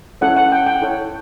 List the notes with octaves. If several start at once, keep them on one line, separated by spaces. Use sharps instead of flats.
C#4 E4 A4 C#5 F#5
F#5
G5
G5
E4 A4 C#5